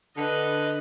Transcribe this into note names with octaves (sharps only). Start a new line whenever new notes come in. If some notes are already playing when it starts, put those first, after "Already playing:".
D3 B4 D#5